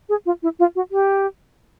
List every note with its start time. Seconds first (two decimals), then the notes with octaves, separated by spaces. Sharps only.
0.09 G#4
0.26 F4
0.43 E4
0.59 F4
0.75 F#4
0.91 G4